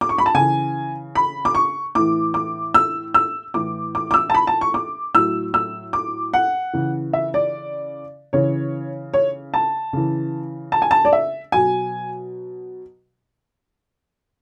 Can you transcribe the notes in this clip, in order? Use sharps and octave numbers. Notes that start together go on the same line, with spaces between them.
D6
C#6
B5
A5
C#3 E3 G#5
B5
D6
C#6
A2 E3 D6
D6
E6
E6
A2 E3 D6
D6
D6
E6
A5
B5
A5
C#6
D6
A2 F#3 E6
E6
D6
F#5
C#3 E3
E5
D5
C#3 E3 C#5
C#5
A5
C#3 E3
A5
G#5
A5
D5
E5
B2 F#3 G#5